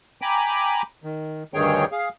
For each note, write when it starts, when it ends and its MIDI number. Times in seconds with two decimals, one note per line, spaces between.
0.22 0.82 79
0.22 0.82 80
0.22 0.82 82
0.22 0.82 83
0.22 0.82 86
1.04 1.43 51
1.54 1.85 38
1.54 1.85 43
1.54 1.85 51
1.54 1.85 68
1.54 1.85 73
1.54 1.85 79
1.92 2.09 68
1.92 2.09 77